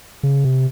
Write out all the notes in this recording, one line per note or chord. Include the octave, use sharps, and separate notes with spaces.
C#3
C3